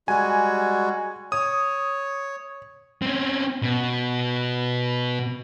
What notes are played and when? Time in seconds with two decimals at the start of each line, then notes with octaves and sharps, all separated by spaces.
0.08 G3 G#3 F#4 G#5
1.32 C#5 D#6
3.02 C4 C#4
3.62 B2